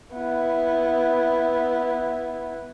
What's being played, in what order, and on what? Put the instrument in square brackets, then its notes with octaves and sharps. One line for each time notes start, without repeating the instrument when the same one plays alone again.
[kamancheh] B3 E4